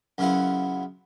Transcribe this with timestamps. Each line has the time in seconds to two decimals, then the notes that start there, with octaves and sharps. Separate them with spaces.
0.18 F#2 C#3 B3 E4 F4